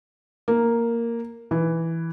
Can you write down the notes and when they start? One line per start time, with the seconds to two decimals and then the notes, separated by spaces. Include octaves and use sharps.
0.48 A#3
1.51 E3